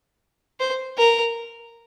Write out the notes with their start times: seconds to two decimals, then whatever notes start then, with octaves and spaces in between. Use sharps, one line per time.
0.60 C5
0.98 A#4